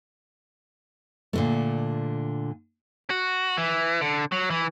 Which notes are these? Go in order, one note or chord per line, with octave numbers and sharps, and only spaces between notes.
A#2 D3 A3
F#4
E3
D3
F#3
E3